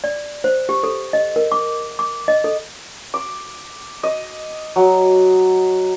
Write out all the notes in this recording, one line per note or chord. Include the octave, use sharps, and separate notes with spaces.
D5
C5
G4
A4
D#5
A#4
D6
D6
D#5
A4
D6
D#5
F#3